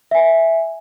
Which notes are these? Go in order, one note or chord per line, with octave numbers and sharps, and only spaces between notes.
E5 G#5